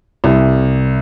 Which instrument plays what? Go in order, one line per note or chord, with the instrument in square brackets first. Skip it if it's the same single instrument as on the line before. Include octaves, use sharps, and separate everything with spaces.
[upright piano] C2